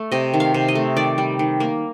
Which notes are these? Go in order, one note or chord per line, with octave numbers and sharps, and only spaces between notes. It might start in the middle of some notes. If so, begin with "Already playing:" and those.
Already playing: A3
C3 D#5
D#3
F5
C3
D#5
A3
D#3 D5
G3
D#3
A#3